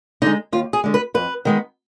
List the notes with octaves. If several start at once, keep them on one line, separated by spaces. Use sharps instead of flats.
D3 G#3 D#4
D#2 F4
G#4
D3 G#3
B4
F2 B4
D#3 G#3 B3